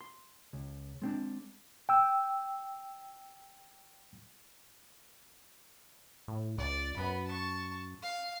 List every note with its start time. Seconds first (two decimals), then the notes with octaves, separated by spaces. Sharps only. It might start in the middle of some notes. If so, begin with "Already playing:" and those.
0.01 C6
0.53 C#2
1.02 G#3 C4 D4
1.89 G5 E6
6.28 A2
6.58 C#2 D5
6.97 F#2 B3 B5
7.27 A5 C#6
8.03 F5